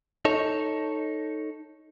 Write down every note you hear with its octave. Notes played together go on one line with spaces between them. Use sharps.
D#4 A4 C#5